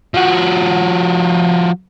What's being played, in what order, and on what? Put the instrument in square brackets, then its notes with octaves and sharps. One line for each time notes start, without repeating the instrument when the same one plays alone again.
[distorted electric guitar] F3 F#4